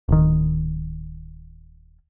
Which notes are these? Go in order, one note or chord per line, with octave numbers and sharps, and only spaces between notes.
D1 D#3